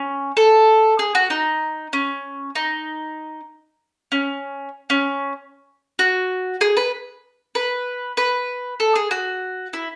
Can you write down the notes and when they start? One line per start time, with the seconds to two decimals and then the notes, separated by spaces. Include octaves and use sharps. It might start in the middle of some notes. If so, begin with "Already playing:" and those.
Already playing: C#4
0.37 A4
0.99 G#4
1.15 F#4
1.30 D#4
1.93 C#4
2.55 D#4
4.12 C#4
4.90 C#4
5.99 F#4
6.61 G#4
6.77 B4
7.55 B4
8.17 B4
8.80 A4
8.95 G#4
9.11 F#4
9.73 E4